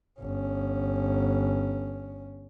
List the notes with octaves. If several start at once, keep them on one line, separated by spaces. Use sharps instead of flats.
G1 C#4